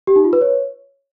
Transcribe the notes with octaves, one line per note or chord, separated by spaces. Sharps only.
G4
D#4
F4
B4
C#5